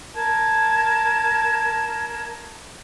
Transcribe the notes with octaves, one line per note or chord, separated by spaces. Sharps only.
A#4 A5 G#6